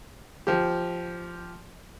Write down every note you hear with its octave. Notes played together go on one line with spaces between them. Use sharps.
F3 G4